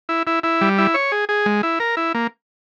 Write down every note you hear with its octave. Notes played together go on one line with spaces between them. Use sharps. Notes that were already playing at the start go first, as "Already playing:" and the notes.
E4
E4
E4
G3
E4
C#5
G#4
G#4
G#3
E4
A#4
E4
A#3